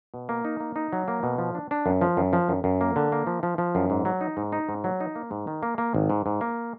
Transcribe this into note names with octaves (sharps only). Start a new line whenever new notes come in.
B2
A#3
D#4
A#3
D#4
F#3
A#3
B2
F3
D4
D4
F#2
F3
F#2
F3
F#2
F#2
A#3
D3
A#3
F3
F3
F3
F#2
G#2
F#3
D#4
G#2
D#4
G#2
F#3
D#4
A#3
G#2
D#3
A#3
A#3
G#1
G#2
G#2
A#3